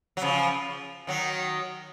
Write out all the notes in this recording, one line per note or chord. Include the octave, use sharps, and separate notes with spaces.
F#3
C#3 F3
D#3 F#3